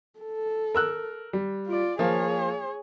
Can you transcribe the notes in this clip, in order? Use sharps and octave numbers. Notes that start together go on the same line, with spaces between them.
A4
A#4 E6 F#6
G3
F4 D5
F3 A#3 G#4 C#5